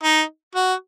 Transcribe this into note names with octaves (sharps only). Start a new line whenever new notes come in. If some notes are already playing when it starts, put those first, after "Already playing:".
D#4
F#4